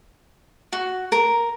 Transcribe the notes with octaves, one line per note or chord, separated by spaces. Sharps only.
F#4
A#4